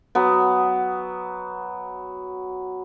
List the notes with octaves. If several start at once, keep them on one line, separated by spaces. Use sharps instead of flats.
F#3 B3